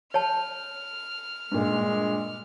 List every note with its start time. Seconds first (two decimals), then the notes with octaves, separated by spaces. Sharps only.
0.14 C#5 A5 F6
1.52 G2 A#2 G#3